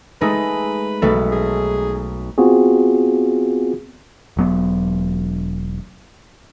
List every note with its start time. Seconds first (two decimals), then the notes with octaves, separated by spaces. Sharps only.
0.21 G#3 A3 D#4 B4
1.02 B1 A3 A4
1.32 G#4
2.38 B3 C4 F4 F#4 G#4
4.37 E1 F#3 B3